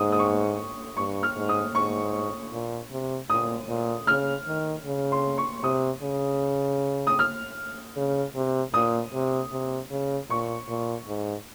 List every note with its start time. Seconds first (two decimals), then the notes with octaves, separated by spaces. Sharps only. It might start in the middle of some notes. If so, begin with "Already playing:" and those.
Already playing: G#2 D#6
0.12 D#6
0.19 C#6
0.97 G2 C#6
1.23 F6
1.36 G#2
1.49 D#6
1.74 G#2 C#6
2.53 A#2
2.92 C3
3.30 A#2 D#6
3.69 A#2
4.07 C#3 F6
4.47 D#3
4.86 C#3
5.12 C6
5.38 C#6
5.64 C3 D#6
6.02 C#3
7.07 D#6
7.19 F6
7.97 C#3
8.35 C3
8.74 A#2 D#6
9.13 C3
9.52 C3
9.91 C#3
10.30 A#2 C#6
10.68 A#2
11.08 G#2